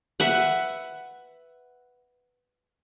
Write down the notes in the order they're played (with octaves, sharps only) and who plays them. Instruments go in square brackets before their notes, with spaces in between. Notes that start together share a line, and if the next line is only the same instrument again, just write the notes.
[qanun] B4 E5 F#5